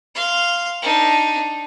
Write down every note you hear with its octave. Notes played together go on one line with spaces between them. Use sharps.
F5 C6
D4 D#4